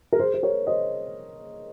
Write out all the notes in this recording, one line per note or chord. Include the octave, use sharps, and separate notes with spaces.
A#4
G#4 C5
C5
A#4 C#5
C5 D#5